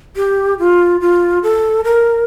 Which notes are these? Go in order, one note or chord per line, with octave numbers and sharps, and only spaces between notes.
G4
F4
F4
A4
A#4